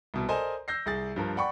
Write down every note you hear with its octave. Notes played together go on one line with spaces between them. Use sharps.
C2 B2
A4 A#4 C5 D5 D#5 G#5
E6 G6 A#6 C7
C2 G#4 A6
G2 F3 A#4
D5 F#5 G5 B5 C#6